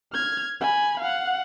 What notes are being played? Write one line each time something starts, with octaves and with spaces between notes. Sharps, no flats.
F6 G#6
G#5 B5
F5 F#5